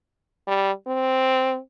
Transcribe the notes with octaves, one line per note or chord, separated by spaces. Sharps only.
G3
C4